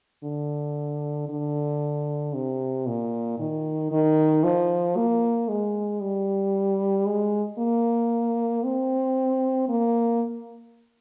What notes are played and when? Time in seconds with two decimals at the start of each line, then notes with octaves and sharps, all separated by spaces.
0.24 D3
1.29 D3
2.34 C3
2.87 A#2
3.39 D#3
3.92 D#3
4.44 F3
4.97 A#3
5.49 G#3
6.02 G3
7.06 G#3
7.59 A#3
8.64 C4
9.69 A#3